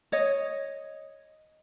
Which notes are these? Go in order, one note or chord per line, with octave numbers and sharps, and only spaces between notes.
C#5 D#5